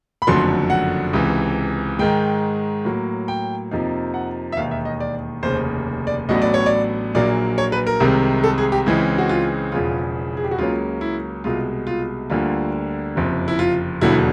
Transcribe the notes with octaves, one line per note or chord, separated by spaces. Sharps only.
B5
F#1 F2 D3 F#3 A3 C6
F#5
C#2 C3 E3
G#2 D#3 G#3 G5
A2 F#3 A#3
G5
F2 C3 F3 A#3 D#4
F#5
E5
E1 D#2 D#3 F5
E5
D#5
D5
F1 D#2 C#3 C5
D5
A1 A2 F#3 B3 D4 D#5
D5
C#5
D5
A#1 A#2 F#3 A#3 D5
C#5
B4
A#4
C2 C3 D#3 G#3
A4
G#4
G4
C#2 C#3 E3 G#3 C4 E4
F#4
F4
E1 E2 C#3 F3 F4
G#4
G4
F#4
C#2 C#3 F#3 A#3 C#4 F4
E4
C2 B2 G#3 F4
F4
D2 D3 G3 A#3 F4
F#1 F2 C3
E4
F4
E1 D#2 D3 F#3 E4